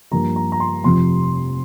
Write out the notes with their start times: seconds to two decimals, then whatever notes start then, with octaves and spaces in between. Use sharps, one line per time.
0.11 G2 F3 A#3 A#5
0.36 A#5
0.52 A#5
0.60 C6
0.84 F1 F2 C3 F3 C6